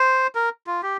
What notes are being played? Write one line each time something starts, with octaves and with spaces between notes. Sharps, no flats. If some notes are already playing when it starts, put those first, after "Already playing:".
Already playing: C5
A#4
F4
G4